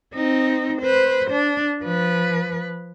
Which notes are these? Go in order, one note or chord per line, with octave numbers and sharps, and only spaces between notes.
C4 D#4
B4 C5
D4
F3 B4